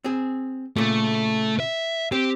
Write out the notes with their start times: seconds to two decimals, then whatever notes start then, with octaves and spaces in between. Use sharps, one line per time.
0.04 C4 G#4
0.76 A#2 C#3 A3
1.60 E5
2.12 C4 G4 C5